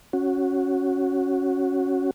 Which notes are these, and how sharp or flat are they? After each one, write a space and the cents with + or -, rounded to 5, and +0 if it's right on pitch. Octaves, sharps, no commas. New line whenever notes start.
C#4 -5 F#4 +0